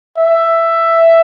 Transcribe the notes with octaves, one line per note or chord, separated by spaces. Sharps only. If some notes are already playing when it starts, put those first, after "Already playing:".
E5